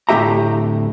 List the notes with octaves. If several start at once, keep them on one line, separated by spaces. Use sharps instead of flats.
D2 A2 C#4 G4 E5 A#5